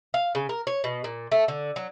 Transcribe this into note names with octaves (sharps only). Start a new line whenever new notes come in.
F5
C#3
A#4
C#5
B2
A#2
A3
D3
F#3